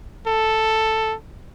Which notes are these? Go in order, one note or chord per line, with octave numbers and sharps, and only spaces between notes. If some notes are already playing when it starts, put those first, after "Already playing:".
A4